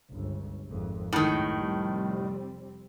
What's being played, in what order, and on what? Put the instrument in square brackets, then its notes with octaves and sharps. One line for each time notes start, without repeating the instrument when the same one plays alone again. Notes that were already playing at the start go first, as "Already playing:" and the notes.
[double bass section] G1 C#2
G#1 F2
[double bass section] C2 F#2 G#3 [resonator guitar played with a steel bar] A2 D#3
[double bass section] F1 G3 C4